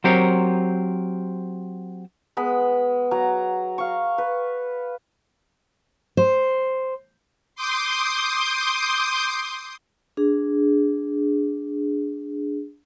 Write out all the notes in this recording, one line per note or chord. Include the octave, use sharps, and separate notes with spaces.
F#3 C4 G4 A#4 C5 C#5
G#3 B3 B5
F#3 A#5
F5 C#6
B4
C5
C6 D6 D#6 G6
D4 G#4